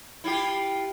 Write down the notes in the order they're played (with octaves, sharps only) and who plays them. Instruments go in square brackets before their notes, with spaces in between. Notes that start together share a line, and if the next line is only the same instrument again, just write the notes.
[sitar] E4 F4 G4